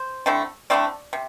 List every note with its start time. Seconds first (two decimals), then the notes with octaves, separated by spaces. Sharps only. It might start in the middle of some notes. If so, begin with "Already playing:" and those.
Already playing: C5
0.26 D3 A3 C4 E4
0.70 D3 A3 C4 E4 D5
1.13 C3